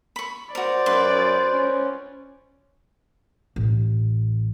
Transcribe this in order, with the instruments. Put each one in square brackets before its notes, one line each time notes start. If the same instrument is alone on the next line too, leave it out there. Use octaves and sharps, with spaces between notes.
[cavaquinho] B5 C#6
[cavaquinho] F#4 A#4 [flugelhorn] C5 [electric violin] D5
[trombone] F#2 [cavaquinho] B4 C6
[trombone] C#4
[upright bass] A1